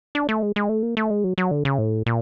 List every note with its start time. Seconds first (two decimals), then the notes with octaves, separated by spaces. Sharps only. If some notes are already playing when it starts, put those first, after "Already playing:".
0.15 D4
0.29 A3
0.42 G#3
0.56 G#3
0.69 A3
0.83 A#3
0.97 A3
1.10 G#3
1.24 F#3
1.38 F#3
1.51 D3
1.65 C#3
1.78 A2
2.06 A#2